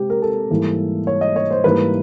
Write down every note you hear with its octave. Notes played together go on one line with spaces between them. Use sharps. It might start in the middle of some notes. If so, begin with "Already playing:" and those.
Already playing: C3 G#3 G4
A#4
A4
G#2 E3 G3 A#3
C#5
D#5
C#5
C5
G#2 E3 G3 A#3 B4